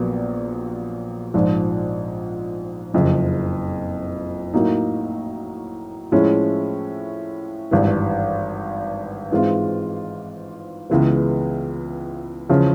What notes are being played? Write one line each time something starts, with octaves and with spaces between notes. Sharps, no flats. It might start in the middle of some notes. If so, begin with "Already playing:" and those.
Already playing: A#1 A#2 F#3 B3
A#1 G#2 F3
F#1 F2 C#3
A2 F#3 A#3 D#4
A2 F3 G#3 C#4 E4
G#1 G2 E3
G#2 E3 G#3 C4 F4
C#2 C#3 E3 G#3 B3
E2 C#3 F3 G#3 C#4